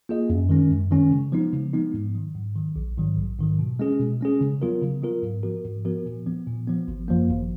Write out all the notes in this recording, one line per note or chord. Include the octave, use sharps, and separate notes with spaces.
A#3 F4 G#4 D#5
F#2
D#3 G#3 C#4
F#2
D#3 G#3 C#4
C#3
F3 G#3 B3 D#4
C#3
F3 G#3 B3 D#4
G#2
D#3 F#3
G#2
D#3 F#3
A#1
G#2 D#3 F#3
A#1
G#2 D#3 F#3
B2
G#3 C#4 G#4
B2
G#3 C#4 G#4
C#3
F#3 B3 F4 A#4
C#3
F#3 B3 F4 A#4
G#2
F3 B3 F#4 A#4
G#2
F3 B3 F#4 A#4
A#2
F3 B3
A#2
F3 B3
G#1
F#2 F3 A#3
G#1